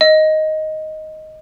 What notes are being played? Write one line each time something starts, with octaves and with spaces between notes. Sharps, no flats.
D#5